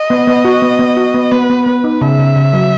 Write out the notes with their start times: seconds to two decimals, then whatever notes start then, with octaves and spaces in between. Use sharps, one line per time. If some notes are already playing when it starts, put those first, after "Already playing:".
Already playing: D#5
0.10 B3
0.27 B3
0.45 F#4
0.62 B3
0.79 B3
0.97 F#4
1.15 B3
1.31 B3 B4
1.50 B3
1.66 B3 B4
1.84 D#4
2.01 C#3 E5
2.19 C#3
2.36 C#3
2.53 F#3